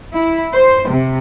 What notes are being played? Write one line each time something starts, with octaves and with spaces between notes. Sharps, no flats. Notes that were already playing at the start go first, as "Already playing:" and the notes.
E4
C5
C3